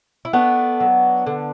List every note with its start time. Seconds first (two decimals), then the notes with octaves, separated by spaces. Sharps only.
0.25 E4
0.33 A3 B3 D4
0.80 F#3
1.26 D3